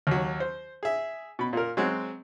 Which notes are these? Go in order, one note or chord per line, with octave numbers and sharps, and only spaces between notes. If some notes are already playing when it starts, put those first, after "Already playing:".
D#2 F#3
C5
G#4 E5
B2 B5
A#2 A#4
F#3 G#3 C4 F#4